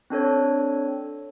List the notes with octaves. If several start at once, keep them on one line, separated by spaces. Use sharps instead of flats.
C4 D4 A4 C#5